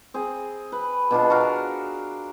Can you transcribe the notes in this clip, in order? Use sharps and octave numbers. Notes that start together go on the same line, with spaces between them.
C4 G#4
B4
B2 D4 F4
F#4 A#4 F5